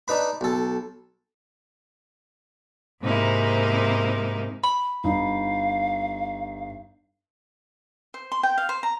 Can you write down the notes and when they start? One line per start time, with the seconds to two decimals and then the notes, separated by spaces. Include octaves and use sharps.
0.08 D4 D#4 B4 B5
0.41 B1 A4
3.01 G#2 C3 A#3 D#4 E4
4.63 B5
5.04 G1 D#4 F5
8.14 C5
8.32 C6
8.43 G5
8.58 F5
8.69 C5
8.83 A#5